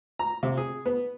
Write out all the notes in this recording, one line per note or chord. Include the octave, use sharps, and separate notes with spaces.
A#5
C3
G#4
B3